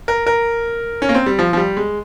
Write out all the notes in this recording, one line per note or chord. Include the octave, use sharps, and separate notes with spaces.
A#4
A#4
C#4
A#3
C4
G3
F3
F3
G3
G#3